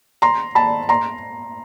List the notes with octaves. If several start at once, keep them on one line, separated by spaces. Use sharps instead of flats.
A#5 C6
A5 B5
A#5 C6